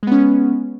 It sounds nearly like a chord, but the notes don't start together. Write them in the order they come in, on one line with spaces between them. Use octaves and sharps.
G#3 B3 C#4